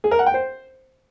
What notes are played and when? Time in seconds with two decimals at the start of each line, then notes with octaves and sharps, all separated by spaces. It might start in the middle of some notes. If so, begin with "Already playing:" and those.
0.04 G#4
0.11 A#4
0.19 F#5
0.26 G5
0.34 C5